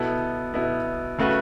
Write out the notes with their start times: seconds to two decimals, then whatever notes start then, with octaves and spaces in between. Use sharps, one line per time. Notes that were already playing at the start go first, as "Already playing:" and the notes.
Already playing: B2 B3 E4 A4
0.54 B2 B3 E4 A4
1.18 C#3 A3 F#4 B4